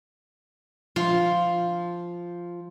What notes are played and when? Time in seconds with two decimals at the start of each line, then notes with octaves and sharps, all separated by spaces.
0.96 F3 F4